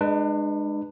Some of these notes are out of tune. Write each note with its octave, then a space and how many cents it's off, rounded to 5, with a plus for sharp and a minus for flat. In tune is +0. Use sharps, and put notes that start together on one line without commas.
G#3 +0 D4 +40 B4 +0